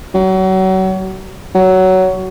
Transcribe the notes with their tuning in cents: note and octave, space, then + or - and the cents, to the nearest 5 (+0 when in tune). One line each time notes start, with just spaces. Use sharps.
F#3 +30
F#3 +15